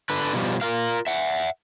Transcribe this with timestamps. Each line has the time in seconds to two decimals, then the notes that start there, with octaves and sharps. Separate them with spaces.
0.10 D3 B4
0.33 B2 F3 G3
0.61 F4 A#4 F5
1.07 E5 F#5